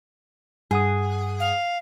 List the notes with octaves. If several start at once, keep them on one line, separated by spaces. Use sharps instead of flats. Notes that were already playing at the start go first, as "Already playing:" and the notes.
G2 G#4 F#5 D#6
F5